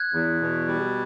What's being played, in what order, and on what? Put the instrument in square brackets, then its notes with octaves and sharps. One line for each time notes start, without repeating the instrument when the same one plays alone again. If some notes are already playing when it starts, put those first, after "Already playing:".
Already playing: [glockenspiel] F#6 G#6
[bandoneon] E2
B2
G3